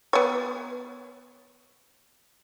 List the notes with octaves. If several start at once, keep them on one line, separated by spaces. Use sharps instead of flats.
B3 C#5